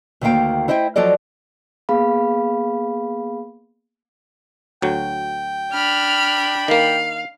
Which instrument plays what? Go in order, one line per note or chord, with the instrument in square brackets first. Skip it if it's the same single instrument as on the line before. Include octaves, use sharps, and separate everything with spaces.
[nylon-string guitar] D2 D#3 A#3 E5 F5 G5
E4 C5 D#5 E5 G5
F3 F#3 F4 A4 D5 D#5
[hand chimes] A#3 B3 G#4 F5 B5
[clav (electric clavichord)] D2 F#3 [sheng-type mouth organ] G5
[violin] D4 B5 [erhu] F6
[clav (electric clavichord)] D#3 A#3 [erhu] F5